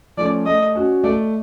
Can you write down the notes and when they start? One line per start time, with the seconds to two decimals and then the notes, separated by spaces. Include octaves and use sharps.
0.17 F3 A3 C#4 D5
0.46 A3 D#5
0.75 C#4 F#4
1.04 A3 D5